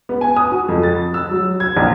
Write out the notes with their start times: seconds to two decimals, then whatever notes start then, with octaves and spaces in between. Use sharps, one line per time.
0.09 B3
0.21 G#5
0.37 D#6
0.52 F#4
0.68 F2
0.83 A6
1.14 E6
1.31 F#3
1.60 G#6
1.77 A#1